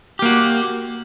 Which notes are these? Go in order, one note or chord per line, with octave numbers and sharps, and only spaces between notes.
A#3 F#4 G4